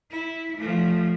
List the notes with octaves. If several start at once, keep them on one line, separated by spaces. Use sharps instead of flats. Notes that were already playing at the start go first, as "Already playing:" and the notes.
E4
F3 A3